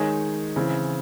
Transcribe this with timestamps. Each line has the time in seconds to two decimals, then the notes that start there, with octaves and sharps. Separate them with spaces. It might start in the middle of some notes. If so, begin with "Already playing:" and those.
Already playing: D#3 G#3 D#4 G#4 C#5
0.56 C#3 E3 C4